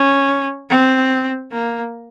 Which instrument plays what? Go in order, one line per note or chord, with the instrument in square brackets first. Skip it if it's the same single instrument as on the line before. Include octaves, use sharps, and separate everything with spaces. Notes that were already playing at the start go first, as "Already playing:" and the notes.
Already playing: [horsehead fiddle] C#4
C4
A#3